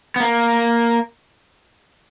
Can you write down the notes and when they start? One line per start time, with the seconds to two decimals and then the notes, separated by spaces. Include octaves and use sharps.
0.16 B3
0.20 A#3